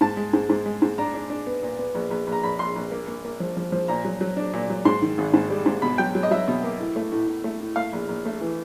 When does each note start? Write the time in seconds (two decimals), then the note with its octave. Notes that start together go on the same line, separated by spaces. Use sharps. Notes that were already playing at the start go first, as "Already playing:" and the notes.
0.01 G#2 A5
0.17 G#3
0.33 G#2
0.49 G#2
0.66 G#3
0.82 G#2
0.98 D4 A#5
1.14 D4
1.30 D4
1.47 B3
1.63 A#2
1.79 B3
1.95 A#1
2.10 A#1
2.27 A#1 A#5
2.43 A#1 B5
2.59 A#1 C6
2.76 A#1
2.91 A#3
3.08 A#3
3.25 A#3
3.40 F3
3.57 F3
3.72 F3
3.88 A#2 A#5
4.05 F#3
4.21 F#3
4.37 D4
4.53 A#2
4.70 F#3
4.85 G#2 C6
5.02 D#3
5.18 G#1
5.33 G#2
5.50 G3
5.66 G#2
5.82 B2 B5
5.98 F#3 G5
6.15 F#3
6.23 D#5
6.31 F#3 E5
6.48 B2
6.64 A#3
6.80 A2
6.96 A3
7.12 A2
7.28 A2
7.44 A3
7.60 A2
7.76 A3 F5
7.93 A#1
8.09 A#1
8.25 A3
8.41 E3